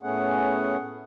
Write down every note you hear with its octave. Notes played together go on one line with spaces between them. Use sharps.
A2 A3 B3 C#4 G#4 F#5